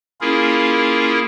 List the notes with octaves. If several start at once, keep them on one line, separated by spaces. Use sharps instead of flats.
A#3 C#4 E4 F4 G#4 A#4